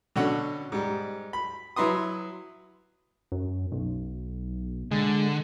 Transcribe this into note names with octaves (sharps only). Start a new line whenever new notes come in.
B2 D3 C#4 F#5
G#2 G3
B5
F#3 E4 B4 C6 D#6
F#2
B1
D3 G#3